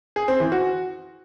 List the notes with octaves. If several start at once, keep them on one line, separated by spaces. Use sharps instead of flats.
G#4
C4
E3
F#4